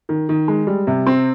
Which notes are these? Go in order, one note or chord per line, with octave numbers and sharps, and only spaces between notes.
D#3
D#3
G#3
G3
C3
C4